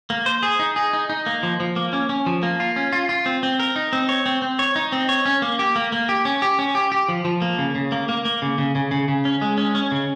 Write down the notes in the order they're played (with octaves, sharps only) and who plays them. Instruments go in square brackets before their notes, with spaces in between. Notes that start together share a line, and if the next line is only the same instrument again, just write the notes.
[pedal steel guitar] A#3
C5
G#4
D#4
G#4
D#4
D#4
A#3
F3
F3
A#3
C#4
C#4
F3
A#3
F4
C#4
F4
F4
C4
C4
A#4
D#4
C4
C#5
C4
C4
C#5
D#4
C4
C#5
C#4
A#3
G4
A#3
A#3
G4
C#4
G4
C#4
G4
G4
F3
F3
A#3
C#3
C#3
A#3
A#3
A#3
C#3
C#3
C#3
C#3
C#3
C#4
G#3
C#4
C#4
C#3